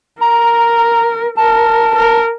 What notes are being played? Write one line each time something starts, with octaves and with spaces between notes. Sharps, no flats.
A#4 A#5
A#4 A5
A#4